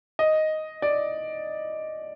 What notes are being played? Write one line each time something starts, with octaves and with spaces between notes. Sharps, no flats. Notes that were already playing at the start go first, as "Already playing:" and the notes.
D#5
D5